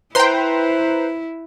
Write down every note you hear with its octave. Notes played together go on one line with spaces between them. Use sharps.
E4 B4 C5 G5 A#5 C6